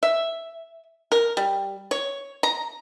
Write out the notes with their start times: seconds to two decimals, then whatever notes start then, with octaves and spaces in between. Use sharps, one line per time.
0.03 E5
1.12 A#4
1.37 G3
1.91 C#5
2.43 A#5